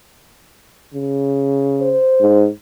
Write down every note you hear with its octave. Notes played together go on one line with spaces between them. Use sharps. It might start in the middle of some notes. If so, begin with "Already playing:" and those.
C#3
C5
G#2